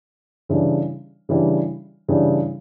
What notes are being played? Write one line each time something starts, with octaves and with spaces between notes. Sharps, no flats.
C#3 E3 G3 D4
C#3 E3 G3 D4
C#3 E3 G3 D4